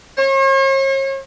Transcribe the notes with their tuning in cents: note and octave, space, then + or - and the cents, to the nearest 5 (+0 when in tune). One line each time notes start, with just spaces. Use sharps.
C#5 -45